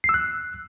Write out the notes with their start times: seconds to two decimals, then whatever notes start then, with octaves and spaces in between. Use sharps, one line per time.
0.04 C7
0.09 E6
0.14 F#6